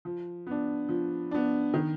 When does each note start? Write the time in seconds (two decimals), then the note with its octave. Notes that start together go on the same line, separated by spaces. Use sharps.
0.05 F3
0.47 B3 D4
0.89 F3
1.31 B3 D4
1.74 D#3